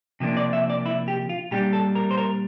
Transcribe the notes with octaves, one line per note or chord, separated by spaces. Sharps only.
C3 F3 A#3 D4
D5
E5
D5
E4
G4
F4
A#2 G3 D4 G4
A4
A#4
C5
A#4